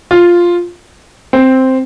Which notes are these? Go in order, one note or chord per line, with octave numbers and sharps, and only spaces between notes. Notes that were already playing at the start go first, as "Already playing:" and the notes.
F4
C4